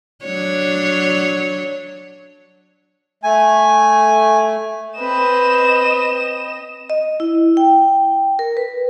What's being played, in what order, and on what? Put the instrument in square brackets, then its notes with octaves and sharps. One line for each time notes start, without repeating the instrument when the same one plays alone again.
[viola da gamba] F#3 D4 C#5
[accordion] A3 [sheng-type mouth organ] G#5
[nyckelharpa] C4 B4 [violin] D#5 E7
[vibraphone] D#5
E4
G5
A#4
B4